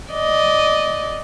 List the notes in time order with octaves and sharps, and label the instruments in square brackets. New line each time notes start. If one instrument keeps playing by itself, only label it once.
[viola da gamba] D5 D#5